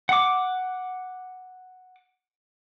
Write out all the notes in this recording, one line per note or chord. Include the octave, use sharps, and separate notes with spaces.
F#5 D6